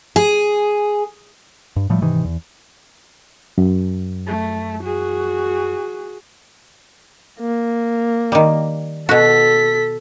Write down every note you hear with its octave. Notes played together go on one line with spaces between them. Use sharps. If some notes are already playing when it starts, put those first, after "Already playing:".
G#4
G2
A2 F3 G3 A3
G#2 C3 D#3 E3
E2
F#2
A3
F#4 G#4
A#3
D#3 G3
B2 F#4 A4 B6